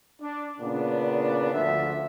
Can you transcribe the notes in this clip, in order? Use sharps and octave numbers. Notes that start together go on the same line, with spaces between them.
D4
A#2 C#3 B3 D4
D2 D3 F3 E5